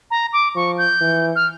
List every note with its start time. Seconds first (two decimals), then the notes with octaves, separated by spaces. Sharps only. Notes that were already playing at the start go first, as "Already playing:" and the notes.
0.11 A#5
0.33 D6
0.56 F3 C#6
0.78 G6
1.01 E3
1.36 F6